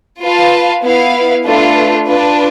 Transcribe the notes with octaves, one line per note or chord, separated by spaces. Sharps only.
F4 B4 F5 A5
B3 E4 B4 F5
A3 D4 F4 B4
D4 F4 B4